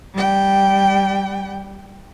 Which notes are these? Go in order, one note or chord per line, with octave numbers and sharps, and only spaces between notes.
G3 G5